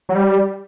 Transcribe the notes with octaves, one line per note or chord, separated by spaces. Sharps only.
F#3
G3